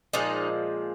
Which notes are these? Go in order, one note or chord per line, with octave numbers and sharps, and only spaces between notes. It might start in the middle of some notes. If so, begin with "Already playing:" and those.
A#2 F3 G#3 D#4